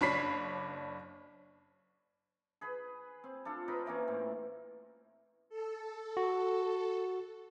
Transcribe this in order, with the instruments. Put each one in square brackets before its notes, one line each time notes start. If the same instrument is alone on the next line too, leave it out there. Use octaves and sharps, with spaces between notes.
[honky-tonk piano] F#1 D4 C#5 B5 B6 C7
[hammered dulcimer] G#4 B4 B5
C4
D4 F4 A4
C4 A#4 B4 D#5
E3 A#3 C4 C#4
A2
[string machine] A4
[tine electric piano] F#4